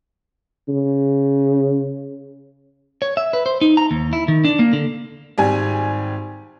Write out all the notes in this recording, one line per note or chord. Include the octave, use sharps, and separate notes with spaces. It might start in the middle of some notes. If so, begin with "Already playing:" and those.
C#3
C#5
E5
B4
C5
D#4
A#5
D#2
E4
D#3
D4
A#3
D3
G#1 G3 G#5